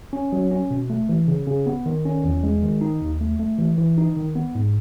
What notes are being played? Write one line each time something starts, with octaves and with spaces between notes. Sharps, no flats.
C#4
F#3
C#4
B2
A3
E3
C#3
C#3
B3
D#3
C#4
E2
G#3
D#3
D#4
D#2
A3
A3
E3
E3
D#4
D#3
B3
G#2